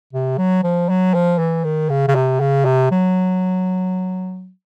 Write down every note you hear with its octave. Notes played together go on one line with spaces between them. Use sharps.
C3
F#3
F3
F#3
F3
E3
D#3
C#3
C#3
C3
C#3
C3
F#3